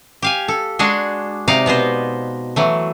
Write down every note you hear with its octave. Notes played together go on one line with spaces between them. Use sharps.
G4 F5 G#5
A4
G#3 D4 F#4 G#4
C3 D#4 D5 F5
B2 B3 B4 C5
E3 F#3 A3